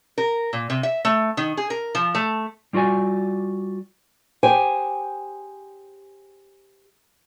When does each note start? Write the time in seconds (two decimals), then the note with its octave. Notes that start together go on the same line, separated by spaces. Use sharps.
0.18 A#4
0.53 A#2
0.70 C3
0.83 E5
1.05 A3
1.37 D#3
1.57 G#4
1.70 A#4
1.95 F3
2.15 A3
2.73 G3 F4 F#4 D5 G#5
4.43 G4 G#4 C5 G5 G#5